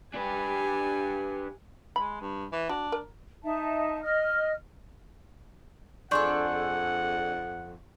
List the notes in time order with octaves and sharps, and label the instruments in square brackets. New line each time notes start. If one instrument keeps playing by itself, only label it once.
[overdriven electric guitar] D4 B4 [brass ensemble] G4 [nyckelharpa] G#5
[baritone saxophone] G#3 [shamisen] B5
[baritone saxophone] G2
E3
[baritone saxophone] D4 [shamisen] F#4
[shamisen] A#4
[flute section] D#4 E5 A5
D#5 F6
[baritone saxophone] F2 [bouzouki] D4 G#4 A4 [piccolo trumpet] F#5 [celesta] C6 C#6 G6